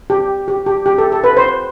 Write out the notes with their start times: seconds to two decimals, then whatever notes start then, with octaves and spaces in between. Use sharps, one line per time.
0.10 G4
0.48 G4
0.66 G4
0.86 G4
0.98 A4
1.12 A4
1.24 B4
1.37 C5